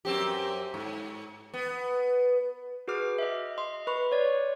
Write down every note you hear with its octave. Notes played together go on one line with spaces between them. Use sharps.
F#2 C4 G4
G#2
B3
F#4 G#4 B4 D6 F6
D#5 E5
D#5 C6
B4 B5 C#6
C#5 D5